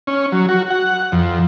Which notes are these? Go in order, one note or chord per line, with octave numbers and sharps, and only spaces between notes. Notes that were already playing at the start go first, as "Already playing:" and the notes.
C#4
F#3
F#4
F#5
F2